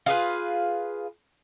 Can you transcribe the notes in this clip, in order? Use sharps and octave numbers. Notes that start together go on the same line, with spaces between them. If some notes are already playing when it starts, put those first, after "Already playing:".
F4 G#4 B4